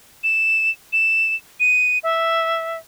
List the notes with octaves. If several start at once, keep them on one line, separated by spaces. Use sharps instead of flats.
E7
E7
D#7
E5